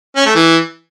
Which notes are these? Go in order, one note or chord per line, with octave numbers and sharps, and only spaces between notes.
C#4
A3
E3